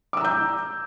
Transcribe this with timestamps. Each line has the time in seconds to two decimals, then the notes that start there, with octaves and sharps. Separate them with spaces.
0.13 D6
0.17 E6
0.21 A#5
0.25 G6